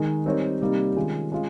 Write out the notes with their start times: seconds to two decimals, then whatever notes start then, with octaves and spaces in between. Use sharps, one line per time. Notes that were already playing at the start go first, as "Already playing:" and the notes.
Already playing: D#3 G#3 D#4
0.25 G3 C4 D#4 A#4 C#5
0.61 C3 G3 A#3 D#4
0.96 D#3 G#3 C#4 F4 G#4
1.32 G#3 C#4 F4